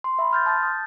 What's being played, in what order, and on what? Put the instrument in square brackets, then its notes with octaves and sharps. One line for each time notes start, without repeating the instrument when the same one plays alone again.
[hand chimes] C6
E5 B5
C6 F6 G6 A6
A5 D#6 G6 A6
D#6